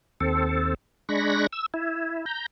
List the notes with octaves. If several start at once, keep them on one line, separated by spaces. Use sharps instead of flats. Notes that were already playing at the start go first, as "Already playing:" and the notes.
D#2 C4 A4
G#3 D4 B5 C#6 A#6
E6
E4
A#5 G6